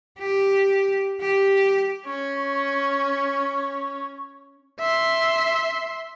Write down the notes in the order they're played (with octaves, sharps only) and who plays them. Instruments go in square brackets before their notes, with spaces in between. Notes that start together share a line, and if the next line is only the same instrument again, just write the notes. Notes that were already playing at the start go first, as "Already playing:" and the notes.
[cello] G4
G4
[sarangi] C#4 [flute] C#6
[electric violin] E5 C6